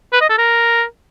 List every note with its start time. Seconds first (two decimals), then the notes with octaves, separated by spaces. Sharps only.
0.13 B4
0.21 D#5
0.30 A4
0.38 A#4